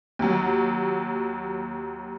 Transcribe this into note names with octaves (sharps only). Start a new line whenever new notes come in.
D#2 F#3